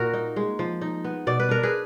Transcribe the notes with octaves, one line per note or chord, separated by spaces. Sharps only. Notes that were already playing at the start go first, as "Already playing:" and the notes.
Already playing: A#2 A#3 F#4 A#4
D#4
G#3
F3
D#4
B3
B2 D5
B4
D4 A#4
G#4 B4